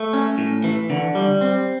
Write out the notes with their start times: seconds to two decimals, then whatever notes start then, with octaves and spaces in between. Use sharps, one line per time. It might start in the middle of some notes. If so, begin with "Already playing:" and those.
Already playing: A3
0.13 C#4
0.38 A2
0.64 E3
0.90 D3
1.15 G3
1.41 C4